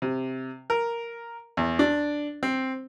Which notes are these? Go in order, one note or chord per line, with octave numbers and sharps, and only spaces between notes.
C3
A#4
E2
D4
C4